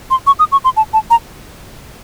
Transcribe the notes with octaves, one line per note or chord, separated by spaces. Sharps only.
C6
C#6
D#6
C#6
C6
A5
A5
A#5